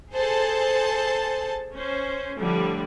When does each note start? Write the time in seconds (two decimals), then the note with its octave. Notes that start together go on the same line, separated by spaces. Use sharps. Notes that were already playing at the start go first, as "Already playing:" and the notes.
0.13 G#4 A4 C5 A5
1.72 C#4 C5
2.38 A2 D3 F3 G3